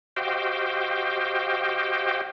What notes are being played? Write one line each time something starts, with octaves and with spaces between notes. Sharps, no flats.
F#4 G4 C5 D#5 F5 G5